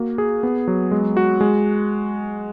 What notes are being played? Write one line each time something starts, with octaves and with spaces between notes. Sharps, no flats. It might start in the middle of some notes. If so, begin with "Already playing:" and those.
Already playing: A#3 F#4
G#4
B3
F#3
G#3
F#4
G#3